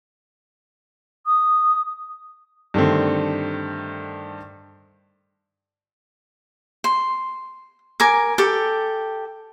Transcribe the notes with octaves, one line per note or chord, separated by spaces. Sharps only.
D#6
G2 D3 D#3 A3 C4
C6
A#4 G#5 D6
G4 A4